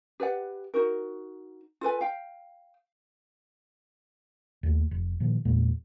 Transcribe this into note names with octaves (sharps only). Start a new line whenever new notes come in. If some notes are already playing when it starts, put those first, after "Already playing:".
G4 B4 D5 F#5
D#4 F#4 A#4
F4 A4 B4 G#5
F5 G5
D#2 A3
F1
A#2 D#3 F3
E2 A#2 G#3